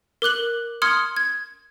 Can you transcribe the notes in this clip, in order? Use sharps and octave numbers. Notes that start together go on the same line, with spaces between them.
A#4 D6 F#6 F#7
C6 D#6 F6 G#6 C#7
G#6